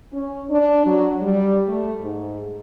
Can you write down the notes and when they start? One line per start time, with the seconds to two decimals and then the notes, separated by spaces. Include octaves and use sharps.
0.13 C#4
0.49 D4
0.86 F#3
1.22 G3
1.68 A3
2.02 G#2